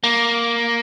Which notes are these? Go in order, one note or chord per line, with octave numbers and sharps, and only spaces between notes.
A#3